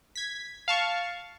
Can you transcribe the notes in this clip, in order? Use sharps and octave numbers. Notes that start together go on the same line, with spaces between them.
G#6 B6
F5 A5 C#6